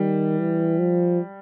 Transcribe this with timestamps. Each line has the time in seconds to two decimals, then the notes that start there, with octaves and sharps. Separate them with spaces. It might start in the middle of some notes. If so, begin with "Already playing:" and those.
Already playing: D#3 G3
0.39 E3
0.79 F3